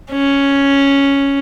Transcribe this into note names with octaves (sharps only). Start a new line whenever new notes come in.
C#4